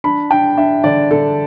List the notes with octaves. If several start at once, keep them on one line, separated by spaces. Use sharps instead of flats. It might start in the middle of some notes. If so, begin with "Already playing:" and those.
D4 B5
D4 G5
D4 E5
D3 D5
D3 A4